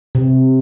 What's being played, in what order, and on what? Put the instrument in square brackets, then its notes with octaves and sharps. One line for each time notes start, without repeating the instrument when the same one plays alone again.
[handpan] C3